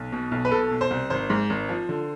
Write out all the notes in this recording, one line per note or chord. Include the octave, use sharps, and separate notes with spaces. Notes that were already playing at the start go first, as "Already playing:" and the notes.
Already playing: B1
B2
B1
B4
B2 A4
B2
C5
C2
G#1 C5
G#2
G#1
F3
D3